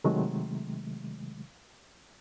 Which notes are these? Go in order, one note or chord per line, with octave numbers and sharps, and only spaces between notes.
C3 D#3 F#3 G#3 A3